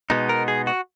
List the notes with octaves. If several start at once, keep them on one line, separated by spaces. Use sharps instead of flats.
B2 G#3 B3 D#4
A#4
G#4
F#4